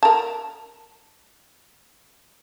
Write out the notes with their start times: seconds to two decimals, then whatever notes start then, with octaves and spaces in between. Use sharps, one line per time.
0.03 A#4 A5